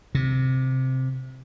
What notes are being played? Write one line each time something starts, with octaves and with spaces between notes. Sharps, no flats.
C3